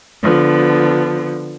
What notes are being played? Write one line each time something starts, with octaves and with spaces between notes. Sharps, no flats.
D3 F3 B3